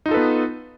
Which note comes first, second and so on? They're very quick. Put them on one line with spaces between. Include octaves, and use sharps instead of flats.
D#4 F4 A4 B4 B3